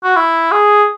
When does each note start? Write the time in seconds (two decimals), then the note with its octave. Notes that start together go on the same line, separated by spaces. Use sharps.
0.04 F#4
0.16 E4
0.52 G#4